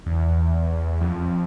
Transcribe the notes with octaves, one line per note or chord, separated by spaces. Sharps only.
E2
F2